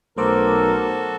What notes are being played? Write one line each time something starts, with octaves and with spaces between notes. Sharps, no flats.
B1 A3 F#4 A4 A#4 C5 D6